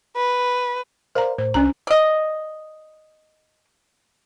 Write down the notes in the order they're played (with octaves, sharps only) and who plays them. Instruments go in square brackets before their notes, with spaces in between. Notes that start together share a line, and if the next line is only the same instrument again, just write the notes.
[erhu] B4
[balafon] A#4 A#5 [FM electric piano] C5 D5 F5
[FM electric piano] A2 [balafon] C5
[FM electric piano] C2 D4 F#6 [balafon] C#4 A#5
[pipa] D5 D#5